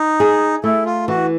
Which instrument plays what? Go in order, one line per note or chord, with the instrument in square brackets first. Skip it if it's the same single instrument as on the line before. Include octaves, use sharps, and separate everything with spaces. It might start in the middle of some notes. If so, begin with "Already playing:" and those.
Already playing: [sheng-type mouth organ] D#4
[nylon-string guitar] G#4
[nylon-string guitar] A3 [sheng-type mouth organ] E4
[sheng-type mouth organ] F4
[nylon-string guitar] E3 [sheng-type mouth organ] F#4